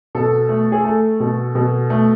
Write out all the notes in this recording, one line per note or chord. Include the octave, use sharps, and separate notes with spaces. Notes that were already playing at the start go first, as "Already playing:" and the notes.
B2 A4
A3
G#4
A3 A4
B2
B2
A3